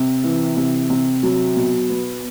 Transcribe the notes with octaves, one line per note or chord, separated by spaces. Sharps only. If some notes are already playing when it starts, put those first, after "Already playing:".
Already playing: C3
E3
C3
C3
F#3
B2
B3